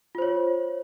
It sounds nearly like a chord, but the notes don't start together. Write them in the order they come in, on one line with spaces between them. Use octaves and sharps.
F4 C5 C#5